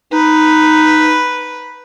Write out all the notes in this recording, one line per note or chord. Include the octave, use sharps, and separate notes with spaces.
D#4 B4